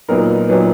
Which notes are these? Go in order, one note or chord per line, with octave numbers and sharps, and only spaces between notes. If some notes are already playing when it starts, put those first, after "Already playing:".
A#2 F#3 B3 D#4 A#4
A#2 F#3 B3 D#4 B4